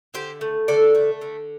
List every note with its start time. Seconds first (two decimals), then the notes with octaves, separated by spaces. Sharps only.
0.14 D3 G4 C5
0.41 A3
0.68 D3 A4 D5
0.95 A3
1.22 D3